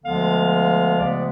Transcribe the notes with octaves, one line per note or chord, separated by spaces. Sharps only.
D2 D3 F3 G#3 B3 F5
D2 C#3 F3 G#3 B3 D5